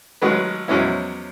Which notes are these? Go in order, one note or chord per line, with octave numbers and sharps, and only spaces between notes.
A1 D#3 F#3 G#3 B4
E2 F3 F#3 G#3 C#4 E4